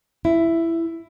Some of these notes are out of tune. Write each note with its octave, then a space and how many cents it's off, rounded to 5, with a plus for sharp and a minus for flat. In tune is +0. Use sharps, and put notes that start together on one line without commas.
E4 +10